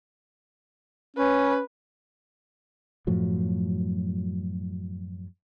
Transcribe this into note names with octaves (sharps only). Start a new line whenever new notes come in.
C#4 B4
F#2 A2 F3 F#3